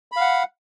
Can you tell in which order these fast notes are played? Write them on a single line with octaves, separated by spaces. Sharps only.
B5 F5 F#5